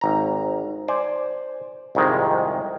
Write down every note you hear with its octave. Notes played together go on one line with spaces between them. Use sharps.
G#1 A#5
C5 D5 G#5
C2 F2 G#2 D#3 G#3